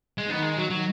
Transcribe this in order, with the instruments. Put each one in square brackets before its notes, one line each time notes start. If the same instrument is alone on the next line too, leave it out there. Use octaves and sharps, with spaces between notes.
[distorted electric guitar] G#3
[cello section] D#3 [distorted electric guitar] B3
[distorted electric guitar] G#3
F#3
F#3